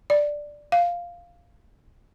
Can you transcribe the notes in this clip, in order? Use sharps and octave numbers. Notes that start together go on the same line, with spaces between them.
D5
F5